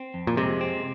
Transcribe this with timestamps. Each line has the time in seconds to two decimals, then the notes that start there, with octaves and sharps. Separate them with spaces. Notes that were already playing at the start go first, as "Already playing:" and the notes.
Already playing: C4
0.14 F2
0.27 A#2
0.37 C3 G#3
0.61 C4